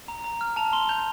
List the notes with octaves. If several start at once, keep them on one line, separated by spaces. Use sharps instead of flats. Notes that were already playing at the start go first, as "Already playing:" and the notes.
A#5
A#5
F6
A5 F7
C6 G7
G6 F7